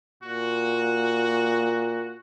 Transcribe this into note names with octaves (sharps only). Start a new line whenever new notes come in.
A#2 F#4